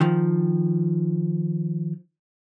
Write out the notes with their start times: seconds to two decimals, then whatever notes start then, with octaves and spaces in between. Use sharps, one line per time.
0.01 D#3 F3